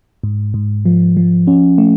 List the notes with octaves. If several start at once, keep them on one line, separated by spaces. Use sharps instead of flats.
G#2
G#2
F3
F3
C#4
A3